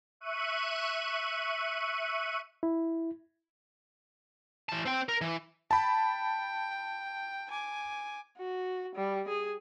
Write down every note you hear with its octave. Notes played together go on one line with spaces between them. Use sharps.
E5 C#6 F#6 D#7
E4
E3 A5
C4 G5
A#4 A#5
E3
G5 A5 B5
G#5 D6
F#4
G3
G#4